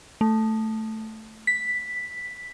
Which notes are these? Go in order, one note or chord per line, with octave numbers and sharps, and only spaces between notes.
A3
B6